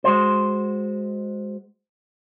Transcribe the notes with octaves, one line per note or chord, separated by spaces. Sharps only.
G#3 F#4 C5